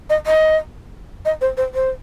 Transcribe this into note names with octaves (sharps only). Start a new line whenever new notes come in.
D#5
D#5
D#5
C5
C5
C5